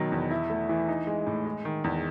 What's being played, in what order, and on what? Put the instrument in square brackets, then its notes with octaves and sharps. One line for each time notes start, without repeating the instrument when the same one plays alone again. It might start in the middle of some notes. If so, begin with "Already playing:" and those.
Already playing: [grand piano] B2 D#3 F#3
E2
E4
A3
E3
D#4
G#3
A2
G#3
D#3
E2